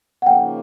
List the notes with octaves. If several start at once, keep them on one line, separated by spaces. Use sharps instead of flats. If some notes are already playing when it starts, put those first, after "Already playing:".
F#5
C#3 F3 A#3 D#4 G5